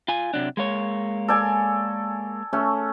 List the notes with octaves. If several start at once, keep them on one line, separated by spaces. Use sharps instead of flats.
F4 G#5
C3 F#3 D4
G#3 A#3 C#5
A4 D5 G#5
A3 C#4